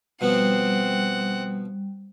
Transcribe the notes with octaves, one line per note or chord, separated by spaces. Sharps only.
B2 F3 G3 B3 C4 F#5